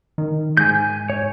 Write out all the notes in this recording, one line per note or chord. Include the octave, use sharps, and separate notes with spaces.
D#3
G#2 G#5 G6
C#5